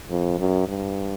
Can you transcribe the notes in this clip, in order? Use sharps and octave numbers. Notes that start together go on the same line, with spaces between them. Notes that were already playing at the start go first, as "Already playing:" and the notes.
F2
F#2
G2